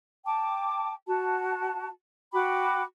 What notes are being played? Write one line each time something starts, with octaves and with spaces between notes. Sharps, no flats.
G5 A5 D6
F#4 A5
F#4 G5 B5 D6